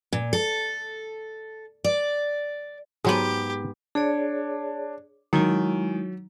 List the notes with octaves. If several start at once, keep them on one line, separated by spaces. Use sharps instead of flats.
A#2
A4
D5
G#2 F#3 B3 G4 G#4
D4 G#4 C#5 D5
D#3 F#3 G#3 E4